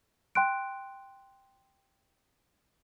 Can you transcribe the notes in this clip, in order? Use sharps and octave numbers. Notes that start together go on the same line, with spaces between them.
G5 C6 F#6 D7